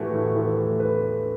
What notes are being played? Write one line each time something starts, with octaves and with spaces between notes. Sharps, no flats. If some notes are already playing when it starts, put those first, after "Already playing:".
Already playing: A2 E3 A3 E4 F#4 G4
A2
E3 A4
A3 A4
E4 B4